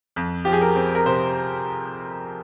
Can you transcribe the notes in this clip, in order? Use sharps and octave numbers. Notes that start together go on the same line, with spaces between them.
F2
F3 G4
G#4
A#4
C4
A#4
C3 C5